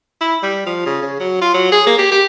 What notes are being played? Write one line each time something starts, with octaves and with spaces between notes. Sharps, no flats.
E4
G3
F3
C#3
C#3
F#3
F4
F#3
G#4
A#3
G4
G4